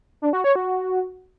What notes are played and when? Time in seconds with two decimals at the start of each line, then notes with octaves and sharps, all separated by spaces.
0.22 D4
0.33 F#4
0.44 C#5
0.55 F#4